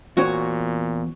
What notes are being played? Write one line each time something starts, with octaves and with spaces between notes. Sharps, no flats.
E2 A#2 C4 F#4 C#5